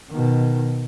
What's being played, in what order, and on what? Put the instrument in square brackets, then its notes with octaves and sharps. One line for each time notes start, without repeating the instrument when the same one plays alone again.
[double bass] B2 D#3